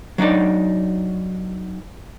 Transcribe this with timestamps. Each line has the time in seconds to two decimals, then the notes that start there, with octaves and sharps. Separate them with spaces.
0.18 F#3 D4 D#4 D5